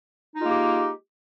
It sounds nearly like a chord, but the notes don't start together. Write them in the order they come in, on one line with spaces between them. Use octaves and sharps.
D#4 F4 G#3 A#3 G4